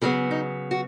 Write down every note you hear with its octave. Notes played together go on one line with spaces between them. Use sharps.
C#3 F#3 B3 G#4
D#4
F#4